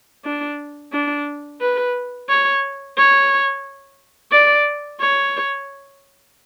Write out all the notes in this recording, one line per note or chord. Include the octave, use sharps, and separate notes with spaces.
D4
D4
B4
C#5
C#5
D5
C#5